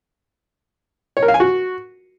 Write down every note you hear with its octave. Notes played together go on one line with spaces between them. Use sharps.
C#5
A#4
F5
G#5
F#4